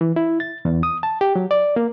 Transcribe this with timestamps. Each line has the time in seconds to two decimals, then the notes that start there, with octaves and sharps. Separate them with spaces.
0.01 E3
0.16 E4
0.40 A6
0.65 E2
0.83 D#6
1.03 A5
1.21 G4
1.36 F#3
1.51 D5
1.76 A#3